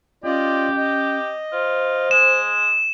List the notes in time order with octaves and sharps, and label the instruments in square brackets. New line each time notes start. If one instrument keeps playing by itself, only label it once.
[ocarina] C#4 [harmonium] F4 D5 D#5 [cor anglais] G4
[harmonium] D#5
[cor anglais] F4 [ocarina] C5
[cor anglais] G#3 [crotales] E7